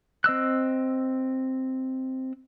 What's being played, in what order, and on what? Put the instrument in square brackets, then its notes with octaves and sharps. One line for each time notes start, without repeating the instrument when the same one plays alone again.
[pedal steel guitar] C4 D#5 E6 F#6